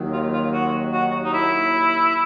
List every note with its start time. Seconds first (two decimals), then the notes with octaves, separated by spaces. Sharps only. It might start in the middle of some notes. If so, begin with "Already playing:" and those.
Already playing: D#2 D#3 F#3
0.13 F4
0.33 F4
0.53 F#4
0.93 F#4
1.24 D#4
1.33 E4